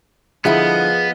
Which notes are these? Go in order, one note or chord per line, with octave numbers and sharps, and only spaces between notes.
D3 F3 G3 B3 E4 G#4 D#5 F#5